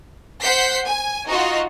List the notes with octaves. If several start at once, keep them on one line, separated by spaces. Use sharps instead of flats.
C5 F#5 G6 B6 C7
G#5
D#4 F4 F#4 D#5